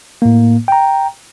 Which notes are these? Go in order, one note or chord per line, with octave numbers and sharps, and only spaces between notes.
A2 A#3
G5 A#5